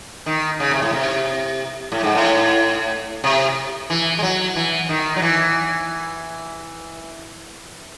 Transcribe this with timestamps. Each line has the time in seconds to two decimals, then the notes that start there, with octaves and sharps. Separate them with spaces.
0.26 D#3
0.60 C#3
0.71 C3
0.82 A2
0.93 C3
1.92 A2
2.03 G#2
2.15 A2
3.24 C3
3.90 E3
4.19 G#3
4.23 F#3
4.56 E3
4.89 D#3
5.16 F#3
5.22 E3